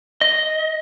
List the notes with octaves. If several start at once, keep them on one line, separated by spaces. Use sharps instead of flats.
D#5